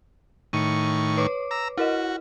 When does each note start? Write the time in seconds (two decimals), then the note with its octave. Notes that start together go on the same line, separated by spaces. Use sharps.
0.53 A2 D#3 C#6 C#7 D#7
1.18 B4 C#5 D6
1.51 A#5 E6
1.78 E4 F#4 A#4 D#5